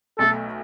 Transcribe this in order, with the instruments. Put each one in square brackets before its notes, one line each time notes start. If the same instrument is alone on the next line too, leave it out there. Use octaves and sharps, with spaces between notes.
[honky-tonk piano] B1 B2 A3 [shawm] A4